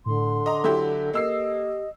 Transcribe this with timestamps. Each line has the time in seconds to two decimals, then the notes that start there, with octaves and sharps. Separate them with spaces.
0.06 A2 D3 C6
0.46 D#5 A#5 D6
0.64 F#3 E4 G4 A4
1.13 A#3 G4 D#5 E6 C7